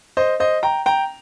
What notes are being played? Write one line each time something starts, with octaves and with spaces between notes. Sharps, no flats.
C5 D#5
C5 D#5
G5 A#5
G5 A#5